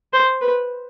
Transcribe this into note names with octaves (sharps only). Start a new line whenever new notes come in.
C5
B4